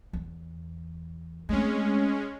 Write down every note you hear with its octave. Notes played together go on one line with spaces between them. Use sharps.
E2
G#3 A3 C4 C#4